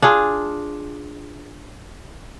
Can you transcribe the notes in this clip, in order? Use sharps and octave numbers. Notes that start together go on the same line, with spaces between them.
D4 F4 G#4